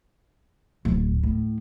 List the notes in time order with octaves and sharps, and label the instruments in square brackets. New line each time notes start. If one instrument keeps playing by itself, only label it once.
[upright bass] D1
A2